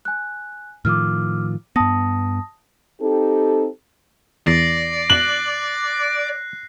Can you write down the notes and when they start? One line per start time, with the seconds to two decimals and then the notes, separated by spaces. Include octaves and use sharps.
0.05 G#5 F#6
0.85 A2 D#3 F3 D6 E6 F6
1.76 G2 B3 A5 D#6 A#6
3.01 C4 D#4 G4 A4
4.47 E2 D5 A#6 C7
5.10 F#6 A#6 F#7